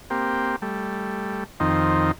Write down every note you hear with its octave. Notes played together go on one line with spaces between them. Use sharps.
A#3 C4 G4
G3 A3
F2 D#3 C4 D#4